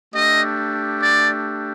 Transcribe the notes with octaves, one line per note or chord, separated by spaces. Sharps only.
A3 D4 G4 D#5
D5